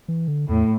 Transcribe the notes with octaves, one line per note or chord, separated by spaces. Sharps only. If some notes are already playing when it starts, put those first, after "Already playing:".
E3
D3
E2 A2